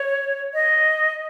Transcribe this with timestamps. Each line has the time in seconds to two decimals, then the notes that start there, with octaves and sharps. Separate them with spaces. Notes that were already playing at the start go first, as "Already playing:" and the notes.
Already playing: C#5
0.54 D#5